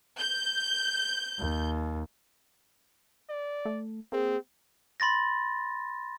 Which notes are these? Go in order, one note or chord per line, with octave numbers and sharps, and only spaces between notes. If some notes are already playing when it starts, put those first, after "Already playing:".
G6
D#2
D5
A3
A#3 C4 G#4
B5 C6 A6 A#6